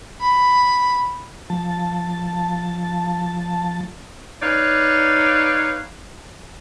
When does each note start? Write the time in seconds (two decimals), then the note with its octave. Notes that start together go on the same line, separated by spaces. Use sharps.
0.21 B5
1.50 F3 A5
4.42 D#4 B4 C#5 D5 F5